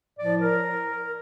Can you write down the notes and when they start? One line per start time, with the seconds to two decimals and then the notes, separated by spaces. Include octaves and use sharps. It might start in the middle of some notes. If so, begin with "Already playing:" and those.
0.19 A2 F3 D5
0.40 A#4